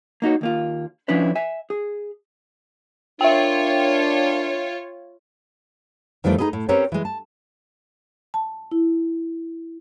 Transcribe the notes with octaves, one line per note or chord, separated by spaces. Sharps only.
A#3 D#4 F#4 C#5
D#2 A#3 F4
F3 C#4 D4 E4 B4 C#5
E5 G#5
G#4
D4 F4 A#4 C#5 E5 G5
F2 D#3 E3 G3 A3 D5
D#4 E4 G#4 B4 D#5
A2
C4 C#4 G4 A#4 B4 C#5
E3 G#3
A5
A5
E4